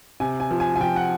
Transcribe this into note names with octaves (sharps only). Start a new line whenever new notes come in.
C3 G#5
G#5
F3
G#5
G#5
F3 G5
F#5